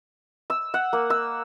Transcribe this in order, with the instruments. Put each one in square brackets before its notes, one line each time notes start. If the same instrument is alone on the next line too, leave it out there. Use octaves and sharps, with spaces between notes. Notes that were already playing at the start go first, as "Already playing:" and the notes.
[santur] E6
F#5
A#3
E6